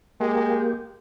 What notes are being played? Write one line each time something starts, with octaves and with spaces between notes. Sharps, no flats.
G#3 A#3 G4